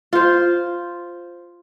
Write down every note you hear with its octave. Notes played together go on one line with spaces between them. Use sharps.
F4 C5